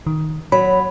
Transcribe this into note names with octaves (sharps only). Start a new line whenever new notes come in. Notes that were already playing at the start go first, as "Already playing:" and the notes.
D#3
F#3 B5